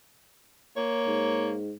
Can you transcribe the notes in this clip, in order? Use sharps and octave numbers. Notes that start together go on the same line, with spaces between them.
A#3 C#5
G#2